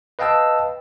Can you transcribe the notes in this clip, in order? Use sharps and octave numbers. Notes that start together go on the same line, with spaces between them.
B4 D#5 F5 G5 A5 E6